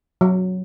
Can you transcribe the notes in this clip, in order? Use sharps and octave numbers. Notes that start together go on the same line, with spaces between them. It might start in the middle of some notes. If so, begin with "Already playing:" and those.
F#3